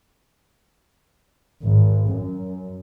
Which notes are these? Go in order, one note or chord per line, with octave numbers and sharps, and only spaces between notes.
G#1
F#2